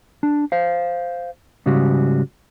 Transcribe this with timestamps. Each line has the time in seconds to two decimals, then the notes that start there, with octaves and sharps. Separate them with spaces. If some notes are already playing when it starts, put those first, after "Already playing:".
0.23 D4
0.52 C5 F5
1.66 G#2 C#3 G3 F#4